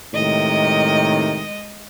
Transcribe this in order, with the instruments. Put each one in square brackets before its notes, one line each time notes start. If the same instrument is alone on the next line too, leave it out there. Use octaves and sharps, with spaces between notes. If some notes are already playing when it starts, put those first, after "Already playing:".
[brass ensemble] A2 C3 D#3 [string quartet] G#3 D#5